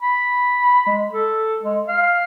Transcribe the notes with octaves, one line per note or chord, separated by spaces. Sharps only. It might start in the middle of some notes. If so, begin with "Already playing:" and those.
B5
G#3
A4
G#3
F5